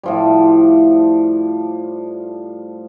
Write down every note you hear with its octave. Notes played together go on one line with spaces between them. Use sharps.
A2 F3 G3